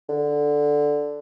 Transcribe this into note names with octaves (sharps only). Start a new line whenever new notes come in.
D3